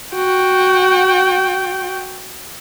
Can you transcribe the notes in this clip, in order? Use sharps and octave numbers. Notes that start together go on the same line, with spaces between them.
F#4 G5